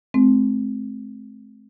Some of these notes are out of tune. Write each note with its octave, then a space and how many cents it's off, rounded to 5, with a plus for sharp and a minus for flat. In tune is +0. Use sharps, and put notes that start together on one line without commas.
A3 -45 C4 +0